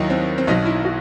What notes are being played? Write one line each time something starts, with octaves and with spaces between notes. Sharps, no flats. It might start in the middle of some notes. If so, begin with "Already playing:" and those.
Already playing: D#2 D#3 F#3 D#4 E4
C4
C4
B1 B2 F#3 D#4
E4
F#4